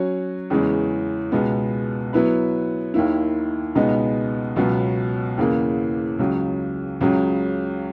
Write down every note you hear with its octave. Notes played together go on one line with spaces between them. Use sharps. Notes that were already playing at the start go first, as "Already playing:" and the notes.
Already playing: F#3 C#4 F#4 C#5
E2 C#3 E3 G#3 C#4
C#2 B2 G#3 B3
F#3 B3 E4 B4
D#2 D#3 A#3 E4
C#2 B2 G#3 B3 D#4
C#2 B2 F#3 B3
E2 C#3 E3 A#3
C#2 C#3 F#3
C#2 C#3 F#3